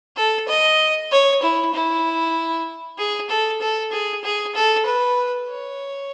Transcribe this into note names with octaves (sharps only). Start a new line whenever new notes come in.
A4
D#5
C#5
E4
E4
G#4
A4
A4
G#4
G#4
A4
B4
C#5